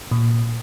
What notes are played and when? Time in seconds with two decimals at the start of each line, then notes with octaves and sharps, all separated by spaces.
0.11 A#2